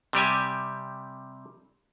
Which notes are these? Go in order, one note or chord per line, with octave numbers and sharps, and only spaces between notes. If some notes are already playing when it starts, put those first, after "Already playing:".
C3 G3 G4 G#5